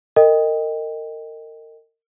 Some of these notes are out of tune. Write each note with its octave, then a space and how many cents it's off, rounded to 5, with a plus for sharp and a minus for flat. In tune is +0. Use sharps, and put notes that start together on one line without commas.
A#4 -35 D#5 +0 G5 +20